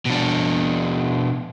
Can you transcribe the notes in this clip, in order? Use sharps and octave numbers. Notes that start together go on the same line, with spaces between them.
B2 D4